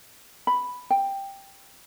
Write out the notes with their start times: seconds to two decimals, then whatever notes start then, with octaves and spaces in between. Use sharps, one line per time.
0.47 B5
0.90 G5